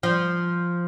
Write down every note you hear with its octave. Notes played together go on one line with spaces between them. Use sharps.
F3